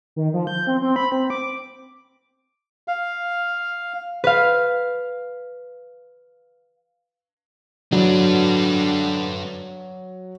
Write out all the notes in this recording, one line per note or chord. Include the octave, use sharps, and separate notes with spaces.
D#3
F3
G6
C4
C4
B5
C4
D6
F5
B4 F5
D3 F#3 D4 B4